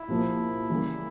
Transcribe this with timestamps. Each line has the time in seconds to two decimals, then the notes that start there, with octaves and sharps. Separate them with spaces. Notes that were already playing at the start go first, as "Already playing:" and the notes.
Already playing: E4
0.08 C2 A#2 F3 A#3
0.70 C#3 E3 G3 A#3